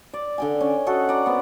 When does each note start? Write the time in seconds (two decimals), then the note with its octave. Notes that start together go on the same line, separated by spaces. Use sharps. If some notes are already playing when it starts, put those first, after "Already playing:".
0.13 D5
0.38 D3 G5 G#5
0.60 C#4
0.86 F#4 A4 D#5
1.09 D5 A#5
1.26 B3 C4